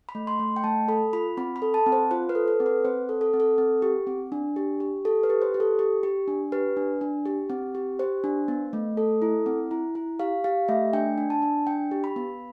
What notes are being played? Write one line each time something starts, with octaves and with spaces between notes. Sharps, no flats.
B5
A3
C6
A3
G5
A3 A5
A4 B5
F4 B5
C4 B5
B5
A4
A5
C4
C5
F4 C5
B4
A4
A4
C4
B4
C4 C5
A4
A4
C4
A4
C4
G4
C4
D4
G4
G4
G4 A4
B4
G4
C5
G4
A4
G4
G4
D4
G4 B4
D4
D4
G4
C4
G4
G4 C5
D4
B3
A3
A4
E4
C4
E4
E4
G4 F5
G4 F5
A3 E5
D4 G5
D4
A5
D4
D4 G5
G4
B5
B3